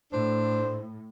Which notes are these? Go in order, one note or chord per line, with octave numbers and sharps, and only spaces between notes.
A2 D4 C5